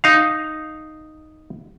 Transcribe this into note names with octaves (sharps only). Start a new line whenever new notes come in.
D#4 F5